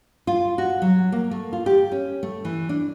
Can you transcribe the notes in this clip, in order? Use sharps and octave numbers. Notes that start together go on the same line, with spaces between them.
F4
F#4
F#3
A#3
A3
F4
G4
C#4
A3
E3
D4